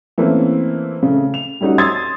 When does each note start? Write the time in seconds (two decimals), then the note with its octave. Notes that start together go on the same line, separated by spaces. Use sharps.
0.18 E3 A3 A#3 C4 C#4
1.02 C#3 A3
1.34 F7
1.61 G3 A3 C#4 D#4 F#4
1.78 C6 D#6 E6 G#6 A6